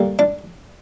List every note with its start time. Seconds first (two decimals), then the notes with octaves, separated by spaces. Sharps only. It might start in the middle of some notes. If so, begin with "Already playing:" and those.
Already playing: D3 G3 A#3
0.19 D4